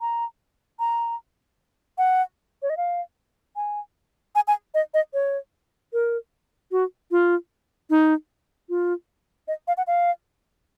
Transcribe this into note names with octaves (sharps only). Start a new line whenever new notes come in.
A#5
A#5
F#5
C#5
D#5
F5
G#5
G#5
G#5
D#5
D#5
C#5
A#4
F#4
F4
D#4
F4
D#5
F5
F#5
F5